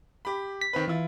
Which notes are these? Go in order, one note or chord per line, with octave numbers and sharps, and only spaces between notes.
G4 B5
B6
D#3 C4 B4
E3 E4 F4